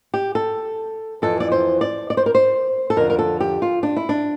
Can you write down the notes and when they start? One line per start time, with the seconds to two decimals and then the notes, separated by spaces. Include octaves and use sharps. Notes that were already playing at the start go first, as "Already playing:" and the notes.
0.14 G4
0.35 A4
1.22 F2 E3 A4
1.40 D5
1.52 C5
1.81 D5
2.10 D5
2.17 C5
2.26 A#4
2.35 C5
2.90 A4
2.96 F2 D3 A#4
3.10 A#4
3.19 A4
3.40 G4
3.62 F4
3.83 D4
3.96 E4
4.09 D4